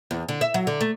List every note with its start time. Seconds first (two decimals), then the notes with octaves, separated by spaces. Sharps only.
0.11 E2
0.29 D3
0.41 E5
0.54 F#3
0.67 D3
0.81 A3